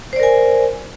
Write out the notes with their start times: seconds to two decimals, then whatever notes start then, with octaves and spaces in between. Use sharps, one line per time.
0.13 C5
0.16 D5
0.20 A#4
0.23 G#5